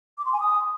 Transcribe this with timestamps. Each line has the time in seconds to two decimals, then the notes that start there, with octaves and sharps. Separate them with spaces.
0.18 D6
0.25 C6
0.33 G#5
0.40 D#6